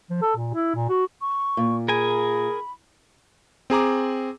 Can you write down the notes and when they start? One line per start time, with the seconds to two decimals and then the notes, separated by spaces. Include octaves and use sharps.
0.10 F3
0.21 A4
0.36 A#2
0.54 E4
0.75 A#2
0.89 F#4
1.21 C#6
1.57 A#2
1.89 G#4 A#4 G#5 B5
3.70 C4 G#4 A#5 D6